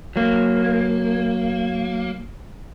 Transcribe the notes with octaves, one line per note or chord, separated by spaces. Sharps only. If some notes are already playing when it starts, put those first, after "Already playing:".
F#3 A#3